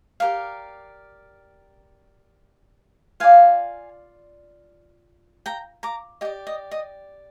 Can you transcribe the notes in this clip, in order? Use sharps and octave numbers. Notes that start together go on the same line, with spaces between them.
G4 A#4 D5 F5
F4 G#4 D5 F5 G#5
G5 A#5
A#5 D6
G4 D5 D#5 G5
D#5
D#5